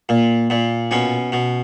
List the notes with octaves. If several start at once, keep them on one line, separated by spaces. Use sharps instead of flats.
A#2
A#2
B2 C#4
B2